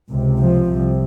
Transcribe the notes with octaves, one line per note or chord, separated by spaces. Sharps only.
C#2 C3
F3
C2 C3